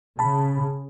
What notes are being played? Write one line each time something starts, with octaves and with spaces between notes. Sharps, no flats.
C#3 A5 B5